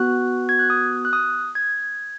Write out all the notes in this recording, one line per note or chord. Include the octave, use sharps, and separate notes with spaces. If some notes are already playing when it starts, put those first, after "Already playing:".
Already playing: B3 F#4 F#6
G#6
F#6
D#6
F#6
D#6
G#6